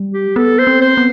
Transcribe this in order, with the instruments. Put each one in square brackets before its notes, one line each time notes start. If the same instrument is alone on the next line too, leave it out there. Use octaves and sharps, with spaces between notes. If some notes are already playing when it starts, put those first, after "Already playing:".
Already playing: [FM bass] G3
[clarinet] G4
[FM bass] B3 [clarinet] A4
[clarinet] C5
[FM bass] C4
[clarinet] C5
[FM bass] B3